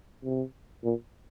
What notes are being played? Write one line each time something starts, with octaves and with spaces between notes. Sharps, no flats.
C3
A#2